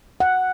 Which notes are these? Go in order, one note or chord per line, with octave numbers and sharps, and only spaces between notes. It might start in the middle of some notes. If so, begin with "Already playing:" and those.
F#5